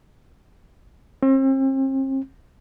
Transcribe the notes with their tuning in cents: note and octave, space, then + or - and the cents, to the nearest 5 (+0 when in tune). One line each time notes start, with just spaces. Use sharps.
C4 +40